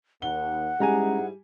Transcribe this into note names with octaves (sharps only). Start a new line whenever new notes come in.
D#2 F#5 G7
G#2 G3 G#3 C#4 E4 G#4 G#5 A#5